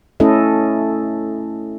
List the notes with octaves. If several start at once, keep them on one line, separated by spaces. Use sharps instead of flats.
A3 C#4 E4 A4 D#5